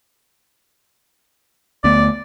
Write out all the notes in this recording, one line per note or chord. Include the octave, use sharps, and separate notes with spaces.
D2 A3 B3 D5